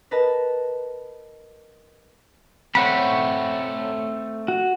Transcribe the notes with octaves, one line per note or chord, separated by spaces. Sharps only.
A#4 B4 D#5 A5
A3 C4 C#5 F#5 B5
F#4